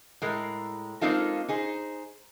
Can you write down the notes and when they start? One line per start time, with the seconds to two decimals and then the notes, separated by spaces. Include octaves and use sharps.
0.22 A2 G#3 A#4
1.01 G#3 A#3 C4 D#4 F4 A4
1.49 D#4 G#4 C5